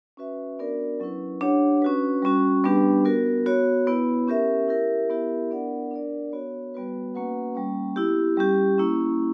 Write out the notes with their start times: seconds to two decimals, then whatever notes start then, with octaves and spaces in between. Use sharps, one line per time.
0.17 C#4 F#4 B4 E5
0.59 B3 D4 F#4 A#4 D5
1.00 F#3 C#4 E4 B4
1.41 D4 G4 C#5 F#5
1.82 C#4 F#4 B4
2.22 G3 C#4 F#4
2.64 G3 B3 D4 G4 B4
3.05 B3 F#4 A#4
3.46 B3 F#4 C#5
3.87 B3 E4 B4
4.27 C#4 G4 A#4 E5
4.68 E4 G4 A#4 E5
5.09 B3 E4 G4 A#4 E5
5.50 B3 D4 A#4 D5 F#5
5.91 D4 A#4 D5
6.32 B3 F#4 C#5
6.74 G3 B3 F#4 B4
7.15 A#3 C#4 F#4 B4 F#5
7.55 G3 A#3 C#4
7.96 B3 E4 G4
8.37 G3 C#4 G4
8.78 A#3 C#4 E4